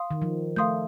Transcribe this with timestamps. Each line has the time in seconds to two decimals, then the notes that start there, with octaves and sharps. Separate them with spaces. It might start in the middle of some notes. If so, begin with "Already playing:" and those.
Already playing: F5 C6 D#6
0.11 D#3
0.22 F3
0.56 A3 F5 C6 D#6 G6